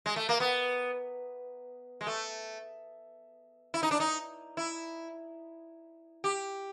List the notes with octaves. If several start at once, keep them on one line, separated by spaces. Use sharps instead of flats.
G#3
A3
A#3
B3
G#3
A3
E4
D#4
D4
D#4
E4
G4